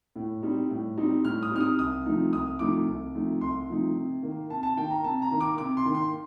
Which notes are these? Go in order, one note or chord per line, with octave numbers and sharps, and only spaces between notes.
A2
G3 C4 D#4
A2
G3 C4 D#4
A2 F6
D#6
G3 C4 D#4 F6
D#6
C2 D#6
C3 F3 A3 D#4
C2 D#6
C3 F3 A3 D#4 D6
C2
C3 F3 A3 D#4
C2 C6
C3 F3 A3 D#4
C3
D#3 A#3
C3 A5
A5
D#3 A#3 G5
A#5
C3 A5
A#5
D#3 A#3
D6
C3 D6
C6
D#3 A#3
C6